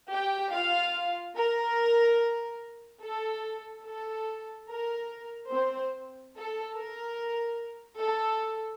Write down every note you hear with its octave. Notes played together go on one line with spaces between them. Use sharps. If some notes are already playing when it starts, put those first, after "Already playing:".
G4 G5
F4 F5
A#4
A4
A4
A#4
C4 C5
A4
A#4
A4